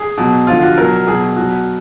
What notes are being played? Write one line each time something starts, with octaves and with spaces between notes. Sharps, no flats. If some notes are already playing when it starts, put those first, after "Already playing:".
Already playing: G#4
B2 F#3
D3 F3 F4
F#4
B2 F#3 A#4
B2 F#3 G#4
B2 F#3 F#4